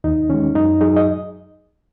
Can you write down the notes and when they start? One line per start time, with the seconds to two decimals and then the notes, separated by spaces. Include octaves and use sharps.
0.04 D#2 D#4
0.30 D#3 G#3 C#4
0.55 F#2 D#4
0.81 F#3 D#4 G#4
0.97 D#5